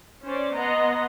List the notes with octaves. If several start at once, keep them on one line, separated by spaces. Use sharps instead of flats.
C#4 C5 D5
B3 D#5 A#5 C6